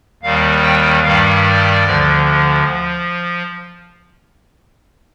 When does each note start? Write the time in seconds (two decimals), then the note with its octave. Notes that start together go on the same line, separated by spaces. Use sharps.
0.23 D#2 D#3 G3 F5
0.63 G5
1.03 G2 D#3 G3 F5
1.43 D5
1.83 D2 D3 F3
2.63 F3